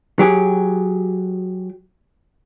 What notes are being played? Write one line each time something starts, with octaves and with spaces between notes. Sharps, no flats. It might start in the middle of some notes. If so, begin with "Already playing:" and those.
F#3 G4 G#4